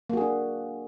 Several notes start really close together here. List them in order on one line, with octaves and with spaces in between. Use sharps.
A#3 F#4 G#4 D4